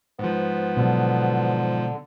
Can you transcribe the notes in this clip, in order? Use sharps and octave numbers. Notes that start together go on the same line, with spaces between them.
G#2 F3 B3
B2 D3 F#3